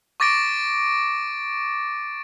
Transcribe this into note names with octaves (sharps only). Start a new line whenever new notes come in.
C#6 D6 A6 A#6 D7